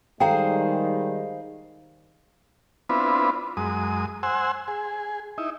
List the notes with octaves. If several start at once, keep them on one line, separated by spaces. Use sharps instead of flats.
D#3 G3 G#3 G#4 C5 F5 G5 A#5
B3 C4 D4 E4 F4 B4
F#2 G#3 D#6
C5 F#5 G#5 E6
G#4
D#4 E4